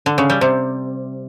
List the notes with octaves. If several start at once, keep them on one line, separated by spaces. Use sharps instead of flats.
D3
C#3
G3
C3